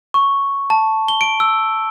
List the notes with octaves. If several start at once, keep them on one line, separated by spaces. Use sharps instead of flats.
C#6
A5
G7
D7
E6